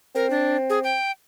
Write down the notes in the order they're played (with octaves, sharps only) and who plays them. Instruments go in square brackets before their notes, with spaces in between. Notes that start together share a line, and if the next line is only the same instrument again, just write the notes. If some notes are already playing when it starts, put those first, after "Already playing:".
[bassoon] C4 [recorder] A#4
[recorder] D4
G#4
G5